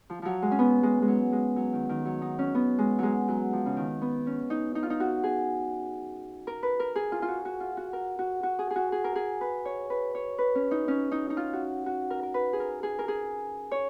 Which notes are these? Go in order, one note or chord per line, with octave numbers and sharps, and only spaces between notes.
F3
F3 F#3
G#3
C#4
B3
G#3
G#3
F#3
G#3
F#3
D#3
D#3
F#3
D#4
C#4
B3
G#3
F#3 G#3
F#3
F3
C#3
D#3
B3
C#4
D#4
D#4
F4
D#4
F#4
G#4
A#4
B4
A#4
G#4
F4
F4
F#4
F#4
F4
F#4
A#4
F#4
F#4
G#4
G#4
F#4
G#4
A#4
G#4
B4
C#5
B4
C#5
B4
C#4
D#4
C#4
D#4
D#4
F4
F#4
F#4
A#4
A#4
B4
G#4
A#4
G#4
A#4
G#4
C#5